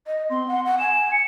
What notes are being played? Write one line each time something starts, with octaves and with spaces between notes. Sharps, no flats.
D#5
C4 C6
F#5
F#5
G#5 E7
C#7